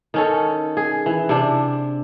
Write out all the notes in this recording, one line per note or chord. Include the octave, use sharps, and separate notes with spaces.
D#3 C#4 A4
G#4
E3
C3 D4